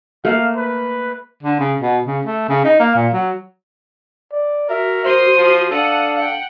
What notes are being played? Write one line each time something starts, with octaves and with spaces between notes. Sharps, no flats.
A3 A#3 F5
B4
D3
C#3
B2
C#3
A3
C#3
D#4
A#3
A#2
F#3
D5
F#4 A#4 E5
C5 C6 D#6
F3
D4 A4 F5 F#5 D#6
F#5 G5